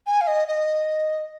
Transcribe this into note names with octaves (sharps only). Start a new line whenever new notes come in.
G#5
F5
D#5
D#5